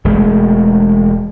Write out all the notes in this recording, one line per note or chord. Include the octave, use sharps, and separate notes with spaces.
E1 G#3 A3